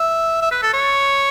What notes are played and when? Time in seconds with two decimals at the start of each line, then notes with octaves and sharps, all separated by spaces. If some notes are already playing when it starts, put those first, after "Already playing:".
Already playing: E5
0.42 E5
0.51 B4
0.63 A4
0.74 C#5